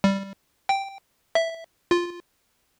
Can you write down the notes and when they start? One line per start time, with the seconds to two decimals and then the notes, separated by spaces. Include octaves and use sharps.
0.04 G3
0.69 G5
1.35 E5
1.91 F4